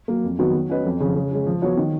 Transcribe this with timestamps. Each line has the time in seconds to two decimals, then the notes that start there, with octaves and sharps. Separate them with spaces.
0.08 F#3 A#3
0.24 F2
0.39 D#3 F#3 B3 F#4
0.54 F#3
0.69 C#4 F#4 B4 D#5
0.85 F2
1.00 C#3 F3
1.15 C#3
1.31 G#3 C#4 G#4
1.46 F3
1.62 B3 F#4 C#5
1.77 D#3